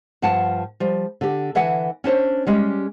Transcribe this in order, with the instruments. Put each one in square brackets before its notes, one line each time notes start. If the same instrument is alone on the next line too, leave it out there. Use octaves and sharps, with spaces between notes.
[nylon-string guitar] G2 F3 F#5 A5
F3 G3
D3 G4
D3 E3 E5 F#5 G#5
C#4 D4 C5 C#5
G3 G#3 C#4 G4